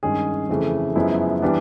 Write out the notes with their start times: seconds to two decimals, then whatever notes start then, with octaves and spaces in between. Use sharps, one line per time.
0.03 G2 D#3 G#3 C#4 G#4
0.49 F2 C#3 E3 A3
0.95 F#2 C#3 F3 G#3 B3 E4
1.42 E3 G3 B3 D4